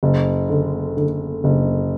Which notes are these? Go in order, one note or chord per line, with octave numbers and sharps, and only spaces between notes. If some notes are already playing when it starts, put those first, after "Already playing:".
F#1
D3
D3
F#1